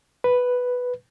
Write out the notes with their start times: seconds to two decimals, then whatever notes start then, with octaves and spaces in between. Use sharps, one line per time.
0.24 B4